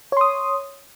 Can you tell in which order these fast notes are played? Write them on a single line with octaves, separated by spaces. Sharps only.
C#5 C6 D#6